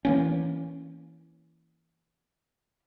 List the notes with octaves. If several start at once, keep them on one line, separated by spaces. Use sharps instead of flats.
E3 A#3 C#4